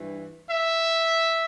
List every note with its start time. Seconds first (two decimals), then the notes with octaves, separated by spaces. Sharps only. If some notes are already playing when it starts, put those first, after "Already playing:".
Already playing: G2 E3
0.50 E5